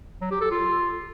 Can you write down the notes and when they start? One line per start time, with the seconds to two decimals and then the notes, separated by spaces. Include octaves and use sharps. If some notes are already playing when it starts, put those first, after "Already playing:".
0.21 F#3
0.31 G4
0.41 A4
0.51 F4